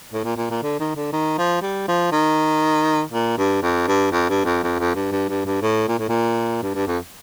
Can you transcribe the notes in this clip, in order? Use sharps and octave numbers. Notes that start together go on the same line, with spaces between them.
A2
A#2
A#2
A#2
D3
D#3
D3
D#3
F3
G3
F3
D#3
A#2
G2
F2
G2
F2
G2
F2
F2
F2
G2
G2
G2
G2
A2
A#2
A2
A#2
G2
G2
F2